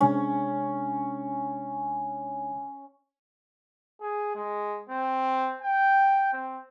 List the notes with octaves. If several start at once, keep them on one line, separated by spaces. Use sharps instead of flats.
C3 G#3 C#4 D4
G#4
G#3
C4
G5
C4